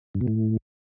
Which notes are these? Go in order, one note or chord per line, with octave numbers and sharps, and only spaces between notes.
G2
B2
A2